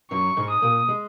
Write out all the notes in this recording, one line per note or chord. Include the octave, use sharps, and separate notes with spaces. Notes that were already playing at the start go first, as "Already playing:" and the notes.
F#2 F#3 C#6
G#2 G#3
D#6
A#2 A#3
G#3